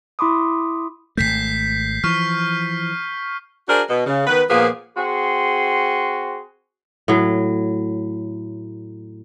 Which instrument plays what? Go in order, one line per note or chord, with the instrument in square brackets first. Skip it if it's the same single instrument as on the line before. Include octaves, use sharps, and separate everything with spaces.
[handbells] E4 B5 C6 D6 D#6
[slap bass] G#1 E2 A3 [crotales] G6 B6 C7
[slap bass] E3 F3 [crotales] C#6 F6
[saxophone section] D4 F#4 G#4 A#4 C5
B2
C#3
D#3 B3 B4
A#2 F3 A#3 B3 G#4
[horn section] C4 F#4 G#4 C6
[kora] A2 F#3